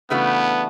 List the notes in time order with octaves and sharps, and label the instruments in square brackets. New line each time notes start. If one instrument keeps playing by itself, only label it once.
[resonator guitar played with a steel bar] C#3 E3 A3 D4 F#4 [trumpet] B3